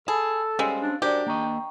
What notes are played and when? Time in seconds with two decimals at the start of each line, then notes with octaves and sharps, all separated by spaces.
0.08 G#4 A4 A5 B5
0.59 G3 G#3 C#4 C5 F5
0.82 D4
1.02 D4 F#4 G4 A#4 C5 D5
1.27 A#3 D#5 G5 A#5 C#6